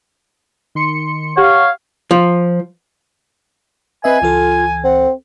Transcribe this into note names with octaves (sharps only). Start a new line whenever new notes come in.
D#3 C6 C#7
G4 C#5 F5 F#5
F3
C4 B4 D#5 E5 G#5
C#2 E3 F4 A4
C4 F#5